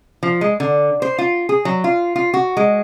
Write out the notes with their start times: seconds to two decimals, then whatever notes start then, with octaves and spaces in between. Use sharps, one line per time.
0.23 F3
0.41 G#3
0.60 D3
1.02 C5
1.18 F4
1.49 G#4
1.65 F#3
1.84 F4
2.16 F4
2.34 F#4
2.57 G#3